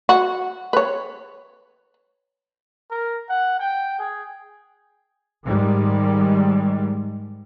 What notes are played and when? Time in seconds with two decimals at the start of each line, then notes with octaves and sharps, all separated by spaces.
0.09 F#4
0.73 B4 C#5
2.90 A#4
3.29 F#5
3.60 G5
3.99 G#4
5.45 G#2 D#3 G3 G#3